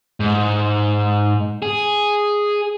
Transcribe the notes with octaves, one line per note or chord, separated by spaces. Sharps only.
G#2
G#4